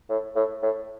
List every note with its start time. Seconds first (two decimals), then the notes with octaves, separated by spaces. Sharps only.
0.10 A2
0.36 A2
0.62 A2